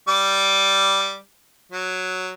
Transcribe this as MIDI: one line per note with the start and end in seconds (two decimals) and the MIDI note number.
0.08 1.17 55
0.08 1.17 86
1.72 2.32 54